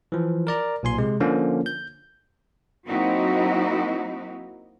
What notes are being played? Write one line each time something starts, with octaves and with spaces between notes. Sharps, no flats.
E3 F3
A#4 D5 A#5
B1 A#2 G#5 C6
C3 G#3
D3 F3 A#3 C#4
G6
F#3 A#3 C4 D#4 E4 F#4